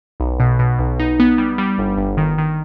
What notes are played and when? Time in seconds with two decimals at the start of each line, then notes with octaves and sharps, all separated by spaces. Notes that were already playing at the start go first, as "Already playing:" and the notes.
0.20 B1
0.40 B2
0.59 B2
0.79 B1
1.00 D#4
1.20 B3
1.38 G3
1.58 G3
1.78 G1
1.97 G1
2.17 D#3
2.38 D#3